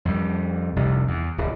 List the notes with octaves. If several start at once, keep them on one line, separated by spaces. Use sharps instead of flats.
F2 G3
F1 C2
E2
D1